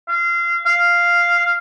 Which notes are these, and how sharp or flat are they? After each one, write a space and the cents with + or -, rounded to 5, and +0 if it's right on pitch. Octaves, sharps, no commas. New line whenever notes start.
F5 -25
F5 -5